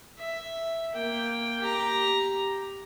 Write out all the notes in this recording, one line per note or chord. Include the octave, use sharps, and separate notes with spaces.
E5
A#3 G5
G4 A#5